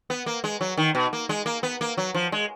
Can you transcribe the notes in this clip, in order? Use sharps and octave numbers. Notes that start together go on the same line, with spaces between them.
B3
A#3
G#3
F#3
D#3
B2
A#3
G#3
A#3
B3
A#3
F#3
F3
G#3